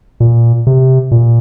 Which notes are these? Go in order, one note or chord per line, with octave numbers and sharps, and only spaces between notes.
A#2
C3
A#2